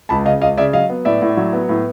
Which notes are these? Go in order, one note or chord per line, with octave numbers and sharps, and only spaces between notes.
C#2 A5 B5
C#3 D#5 F5
C#2 D#5 F5
C#3 D5 E5
F#3 D#5 F5
B3
A2 D5 E5
A2
F#3
B3
A2